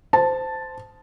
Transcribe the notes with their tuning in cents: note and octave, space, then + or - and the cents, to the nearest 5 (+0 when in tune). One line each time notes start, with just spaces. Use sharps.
C5 -15 A5 +0